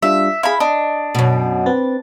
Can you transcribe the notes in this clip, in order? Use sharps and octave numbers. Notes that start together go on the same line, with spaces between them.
G3 D4 F4 E5
E4 G#4 F5 B5
D4 D#5
F#2 B2
C4 B4 A6